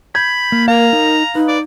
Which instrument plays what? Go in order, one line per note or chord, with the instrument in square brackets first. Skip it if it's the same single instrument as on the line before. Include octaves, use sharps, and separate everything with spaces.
[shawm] B5 [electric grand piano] G6 G#6
[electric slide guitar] A#3
[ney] A#4 [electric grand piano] F5 [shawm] A#5
[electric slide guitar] D#4
[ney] D#4 [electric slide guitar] B4
[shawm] D5